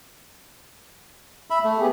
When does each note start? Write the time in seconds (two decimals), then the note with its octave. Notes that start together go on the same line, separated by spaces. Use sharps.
1.50 E5 B5
1.64 A3
1.79 B3 G4 G#4